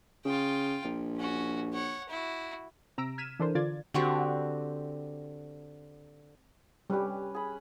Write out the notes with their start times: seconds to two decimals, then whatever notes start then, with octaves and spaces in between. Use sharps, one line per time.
0.25 C#3 F4 G5
0.84 A#1
1.17 C#4 F#4
1.74 C#5 F#5
2.09 E4 F#4
2.98 C3 A#5 E6 A#6 D7
3.18 F6 G#6 B6 D#7 E7
3.40 E3 D4 A4 A#4 C5
3.55 D3 F4 D5 G#6 A6
3.94 D3 C4 F#4 G4
6.90 G3 C#4 G4 B4
7.34 G#4 B5